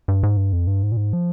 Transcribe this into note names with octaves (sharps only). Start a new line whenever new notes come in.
G2
G#2
G2
F2
G2
G#2
A#2
G#2
F3